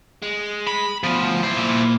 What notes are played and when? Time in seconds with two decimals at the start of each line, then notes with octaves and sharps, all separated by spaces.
0.22 G#3
0.67 B5
1.04 D2 B2 F3
1.43 E4 C5
1.57 A#2